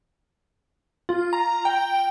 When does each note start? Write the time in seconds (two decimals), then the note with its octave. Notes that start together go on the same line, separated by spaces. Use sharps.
1.09 F4
1.33 A#5
1.65 G5